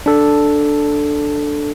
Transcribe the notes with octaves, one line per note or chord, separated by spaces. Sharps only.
D4 A4